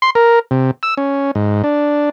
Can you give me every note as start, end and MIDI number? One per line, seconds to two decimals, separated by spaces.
0.02 0.10 84
0.15 0.39 70
0.51 0.71 48
0.83 0.94 88
0.97 1.31 61
1.35 1.62 44
1.64 2.10 62